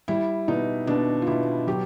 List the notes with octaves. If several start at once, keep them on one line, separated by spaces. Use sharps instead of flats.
G3 E4
B2 D#4
B2 D4
F4
B2 E4
F#3 G4